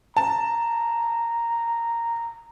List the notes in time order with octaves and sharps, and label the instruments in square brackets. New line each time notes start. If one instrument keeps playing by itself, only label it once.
[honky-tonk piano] A5 [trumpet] A#5